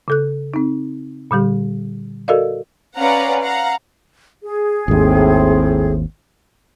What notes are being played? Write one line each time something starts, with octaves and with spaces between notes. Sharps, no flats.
C#3 A4 F#6
C4 D#4
A#2 D3 G3 G4
F#4 A4 A#4 D5 D#5 F5
C#4 B4 D5 F5 F#5 A#5
F5 F#5 A#5
G#4
G#1 D#2 A2 C4